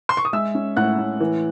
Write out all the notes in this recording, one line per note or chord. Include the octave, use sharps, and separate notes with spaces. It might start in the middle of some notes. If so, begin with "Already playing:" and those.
C6
C#6
D#6
G#3 E5 E6
C#4
A2 F#5 F#6
A2
E3